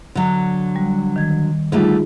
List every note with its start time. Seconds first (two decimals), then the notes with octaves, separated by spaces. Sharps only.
0.15 D3 F#3
0.76 G3
1.16 D#3 G#6
1.72 D3 G3 A3 D#4 F4 G#4